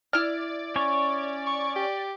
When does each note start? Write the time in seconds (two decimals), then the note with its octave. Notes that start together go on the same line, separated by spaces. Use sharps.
0.13 E4 D5 F6
0.76 C#4 C#5
1.47 C#6
1.76 G4